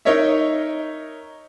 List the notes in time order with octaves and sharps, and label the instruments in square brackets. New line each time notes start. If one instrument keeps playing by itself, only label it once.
[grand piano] D#4 A#4 C#5 D#5 E5